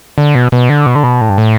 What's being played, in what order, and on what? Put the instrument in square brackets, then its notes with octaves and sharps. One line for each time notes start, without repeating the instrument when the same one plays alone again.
[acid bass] D3
B2
B2
D3
B2
D3
B2
A2
G2
A2